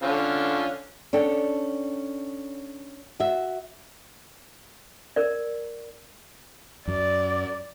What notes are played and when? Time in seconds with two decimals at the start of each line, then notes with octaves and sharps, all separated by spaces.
0.03 D3 C#4 F4
1.13 C#4 D4 A4 G5
3.20 F#4 E5
5.16 A#4 D5
6.88 F#2 D5